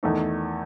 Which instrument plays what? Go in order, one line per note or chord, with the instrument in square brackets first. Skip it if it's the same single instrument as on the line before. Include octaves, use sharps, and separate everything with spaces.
[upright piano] E2 D#3 A3 D#4